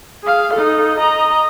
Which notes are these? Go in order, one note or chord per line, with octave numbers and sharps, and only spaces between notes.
G#4 F5
D#4 A4
D#5 A#5